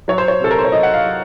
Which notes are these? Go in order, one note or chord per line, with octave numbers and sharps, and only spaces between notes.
F#3 C#5
C5
C#5
C3 A4
A#4
C5
C#5
F#3 D#5
F#5
F5
F#3